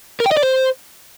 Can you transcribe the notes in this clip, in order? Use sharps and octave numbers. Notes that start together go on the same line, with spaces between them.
A#4
G5
D#5
D5
C5